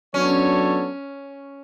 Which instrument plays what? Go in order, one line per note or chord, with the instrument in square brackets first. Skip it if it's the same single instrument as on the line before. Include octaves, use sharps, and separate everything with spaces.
[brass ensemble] F#3 B3 D4 A4 C#5 [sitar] C#4